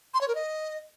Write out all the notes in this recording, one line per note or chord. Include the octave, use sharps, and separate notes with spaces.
C6
C#5
A#4
D#5